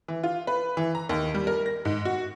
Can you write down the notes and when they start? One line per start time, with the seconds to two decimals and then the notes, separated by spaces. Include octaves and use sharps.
0.08 E3
0.23 F4
0.47 B4
0.77 E3
0.95 A#5
1.09 D#2
1.35 G3
1.47 A#4
1.66 A#6
1.85 G#2
2.05 F#4